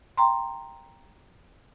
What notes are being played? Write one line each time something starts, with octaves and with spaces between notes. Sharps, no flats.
G5 A#5 C6